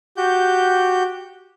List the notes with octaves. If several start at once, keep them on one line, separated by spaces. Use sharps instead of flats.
F#4 G4 G6